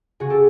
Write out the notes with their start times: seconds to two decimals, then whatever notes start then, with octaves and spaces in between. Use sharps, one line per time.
0.20 C#3 F#4 G#4
0.30 G4 A4